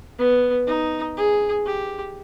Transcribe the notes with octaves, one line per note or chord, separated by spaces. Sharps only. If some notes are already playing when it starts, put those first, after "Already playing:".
B3
D#4
G#4
G4